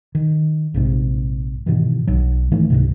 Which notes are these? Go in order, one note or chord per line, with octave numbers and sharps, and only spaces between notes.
D#3
A#1 G#2 C3
G#2 B2 D#3 E3
B1 F#3
G#2 D#3 E3 A3
C#2 G#2 C3